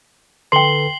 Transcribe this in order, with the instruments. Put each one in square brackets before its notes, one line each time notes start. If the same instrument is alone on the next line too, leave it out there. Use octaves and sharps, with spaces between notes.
[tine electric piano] D3 A4 B4 [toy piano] G5 C6 [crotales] C7 F#7 G7